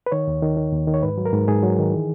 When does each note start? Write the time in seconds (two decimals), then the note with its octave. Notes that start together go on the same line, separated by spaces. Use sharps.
0.06 B4
0.12 D#3 C#5
0.27 D#2
0.42 D#3
0.57 D#3
0.73 D#2
0.87 D#3
0.94 C#5
1.02 G#2 B4
1.18 F#3
1.26 A#4
1.33 G#2
1.48 G#2 G#4
1.63 F#3
1.78 D#3
1.93 E3